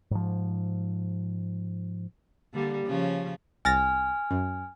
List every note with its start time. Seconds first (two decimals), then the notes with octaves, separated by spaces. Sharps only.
0.11 G#2 F3
2.53 D3 G3 A#3
2.87 C#3 F3 C#4
3.65 C2 G#5 F6 A6 A#6
4.31 F#2